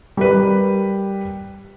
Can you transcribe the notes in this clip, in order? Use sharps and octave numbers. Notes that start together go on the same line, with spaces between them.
G3 A#4 B4